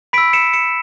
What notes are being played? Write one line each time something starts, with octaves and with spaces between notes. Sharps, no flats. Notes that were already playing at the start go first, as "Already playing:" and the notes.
B5 E6 B6 D7
C#7 E7
C#7 E7